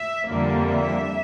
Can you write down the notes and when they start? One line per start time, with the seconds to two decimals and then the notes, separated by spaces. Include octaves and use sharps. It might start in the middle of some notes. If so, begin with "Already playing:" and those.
Already playing: E5
0.29 F2 D3 G3 A#3
0.67 E5